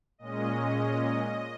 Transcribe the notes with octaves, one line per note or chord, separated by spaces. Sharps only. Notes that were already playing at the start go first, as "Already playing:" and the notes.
A#2 G#3 C#4 D#5